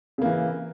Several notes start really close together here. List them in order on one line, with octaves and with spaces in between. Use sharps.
C#3 A#3 E3